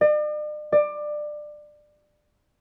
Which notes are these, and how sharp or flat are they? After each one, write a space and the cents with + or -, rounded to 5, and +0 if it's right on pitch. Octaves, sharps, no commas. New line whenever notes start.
D5 +45
D5 +20